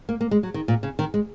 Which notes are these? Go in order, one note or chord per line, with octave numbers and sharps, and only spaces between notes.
A#3
A#3
G#3
F#3
D#3
A#2
C#3
D#3
G#3